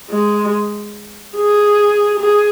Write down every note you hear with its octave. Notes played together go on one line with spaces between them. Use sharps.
G#3
G#4
G#4